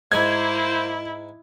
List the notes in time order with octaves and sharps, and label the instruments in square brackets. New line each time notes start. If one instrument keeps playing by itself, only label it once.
[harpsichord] G#2 G#3 G#5 [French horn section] A#3 C5 [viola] E4 [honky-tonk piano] G#6